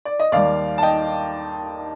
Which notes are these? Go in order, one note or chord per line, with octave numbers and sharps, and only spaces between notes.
D5
D#5
D#2 D#3 G3 D5 F5
A5
D#5 G5